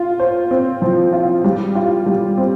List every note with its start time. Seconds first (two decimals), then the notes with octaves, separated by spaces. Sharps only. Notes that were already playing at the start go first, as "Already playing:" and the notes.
Already playing: F4
0.19 C5
0.51 C4
0.82 F3
1.13 F4
1.44 G3
1.75 F4
2.06 G3
2.37 C4